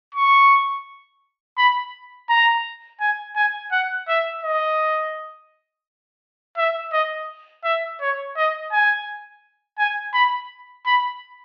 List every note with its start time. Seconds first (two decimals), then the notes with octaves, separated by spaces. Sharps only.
0.15 C#6
1.58 B5
2.29 A#5
3.00 G#5
3.36 G#5
3.72 F#5
4.08 E5
4.43 D#5
6.57 E5
6.92 D#5
7.64 E5
8.01 C#5
8.36 D#5
8.72 G#5
9.78 G#5
10.14 B5
10.86 B5